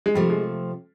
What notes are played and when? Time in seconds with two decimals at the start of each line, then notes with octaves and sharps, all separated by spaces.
0.06 G#3
0.14 C3 F3 G3 A3
0.30 G#3